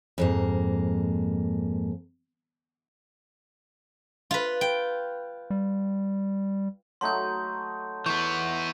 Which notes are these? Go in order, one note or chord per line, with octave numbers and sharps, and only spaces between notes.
F2 G#2 A#3
F4 B4
G5
G3
F#3 A3 D#4 C6 G6
E3 B3 C#6 G6